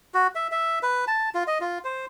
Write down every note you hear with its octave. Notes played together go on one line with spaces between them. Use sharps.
F#4
E5
E5
B4
A5
F4
D#5
F4
C5